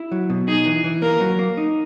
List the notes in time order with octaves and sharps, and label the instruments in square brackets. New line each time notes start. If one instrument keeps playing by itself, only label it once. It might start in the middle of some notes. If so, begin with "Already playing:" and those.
Already playing: [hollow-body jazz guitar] E4
F#3
B2
[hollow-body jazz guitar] D#4 [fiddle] G#4
[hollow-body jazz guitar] E3
E3
[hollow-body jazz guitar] A#3 [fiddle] A#4
[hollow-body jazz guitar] F#3
A#3
D#4